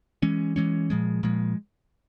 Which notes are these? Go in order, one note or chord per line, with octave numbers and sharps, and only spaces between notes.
E3 G#3 C#4
E3 G#3 C#4
A#2 F3 G#3
A#2 F3 G#3